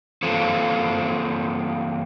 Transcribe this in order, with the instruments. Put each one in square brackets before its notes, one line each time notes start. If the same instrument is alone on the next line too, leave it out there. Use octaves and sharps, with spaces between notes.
[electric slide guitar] E3 A#3 C4 F4 A4 B4